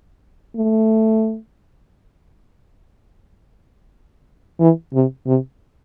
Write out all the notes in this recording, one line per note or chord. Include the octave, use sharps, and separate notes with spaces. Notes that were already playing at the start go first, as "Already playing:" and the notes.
A3
E3
C3
C3